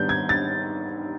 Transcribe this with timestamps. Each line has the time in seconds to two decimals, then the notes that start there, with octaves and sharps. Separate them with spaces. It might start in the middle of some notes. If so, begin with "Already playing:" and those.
Already playing: G#2 D#3 G3 B3 D4 G6
0.09 G#6
0.29 A6